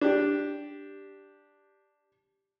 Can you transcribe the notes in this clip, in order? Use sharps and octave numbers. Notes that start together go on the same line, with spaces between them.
D4 G4